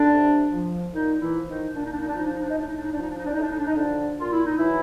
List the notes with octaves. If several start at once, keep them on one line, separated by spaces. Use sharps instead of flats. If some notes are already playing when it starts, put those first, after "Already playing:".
Already playing: D3 D4
C3
F3
A#2 D#3 D#4
E3 E4
F3
D#3 D#4
A#2 D4
D#4
D4
D#4
D4
F3 D#4
D4
D#4
D4
D#4
A2 D4
D#4
D4
D#4
D4
F3 D#4
D4
D#4
D4
D#4
A2 D4
D#4
D4
D#4
D3 F3 D4
A#2 F4
E4
D#4
E3 F#3 E4